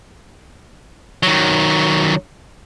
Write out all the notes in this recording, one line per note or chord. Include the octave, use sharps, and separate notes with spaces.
D#3 F#3